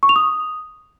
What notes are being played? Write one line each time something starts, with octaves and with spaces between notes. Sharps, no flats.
C#6
F7
D#6